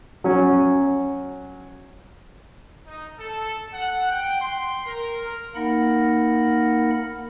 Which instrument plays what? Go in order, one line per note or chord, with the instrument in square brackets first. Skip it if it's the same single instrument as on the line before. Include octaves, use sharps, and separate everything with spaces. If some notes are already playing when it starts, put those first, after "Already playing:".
[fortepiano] F#3 C#4
[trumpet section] D#4
A4
F#5
G5
C6
A#4
[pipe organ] A#3 D#4 A#4 F#5 B5 A#6